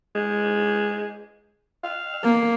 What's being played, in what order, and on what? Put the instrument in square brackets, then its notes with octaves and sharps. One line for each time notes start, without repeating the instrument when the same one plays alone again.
[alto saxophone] G#3
F5
[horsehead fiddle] A#3